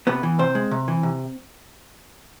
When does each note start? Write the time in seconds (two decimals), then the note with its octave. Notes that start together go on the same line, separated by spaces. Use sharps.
0.07 C3 B3 B4
0.23 E3
0.39 C3 C4 C5
0.55 G#3
0.71 C3
0.88 E3
1.03 C3